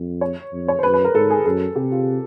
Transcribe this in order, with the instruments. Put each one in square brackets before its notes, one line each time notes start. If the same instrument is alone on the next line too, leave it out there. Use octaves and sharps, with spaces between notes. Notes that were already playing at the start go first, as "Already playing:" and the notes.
Already playing: [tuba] F2
[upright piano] C#5
[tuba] F2
[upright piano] C#5
C5
[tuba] F#2 [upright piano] B4
[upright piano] B4
A#4
[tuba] G#2 [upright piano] A4
[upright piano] G#4
[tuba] F#2 [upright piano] A4
[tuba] C3 [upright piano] G4
[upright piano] F4